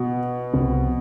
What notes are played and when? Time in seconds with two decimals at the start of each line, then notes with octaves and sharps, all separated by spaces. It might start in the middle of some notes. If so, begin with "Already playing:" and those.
Already playing: B2
0.53 C2 C3 F3 C4